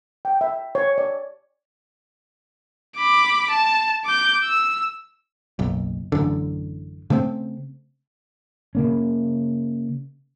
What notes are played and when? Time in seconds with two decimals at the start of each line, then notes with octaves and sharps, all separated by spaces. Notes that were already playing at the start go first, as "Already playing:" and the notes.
0.25 G5
0.41 E5
0.75 C#5
0.98 D5
2.96 B5 D6
3.50 A5
4.05 D6 G6
4.44 E6
5.59 F#1 B1
6.12 A1 F#2 D3
7.10 C#3 A3 A#3 C4
8.75 C#3 A#3 C#4